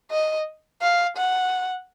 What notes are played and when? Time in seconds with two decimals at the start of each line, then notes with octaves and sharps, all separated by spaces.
0.11 D#5
0.82 F5
1.17 F#5